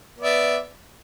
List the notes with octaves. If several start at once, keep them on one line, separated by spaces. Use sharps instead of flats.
B3 D5 E5